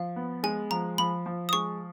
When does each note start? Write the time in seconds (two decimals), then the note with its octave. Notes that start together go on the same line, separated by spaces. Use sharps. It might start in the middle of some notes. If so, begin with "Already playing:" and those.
Already playing: F3 F5
0.16 B3
0.43 G#3 G#5
0.70 F3 A#5
0.98 F3 B5
1.26 F3
1.49 D#6
1.53 G#3 C#6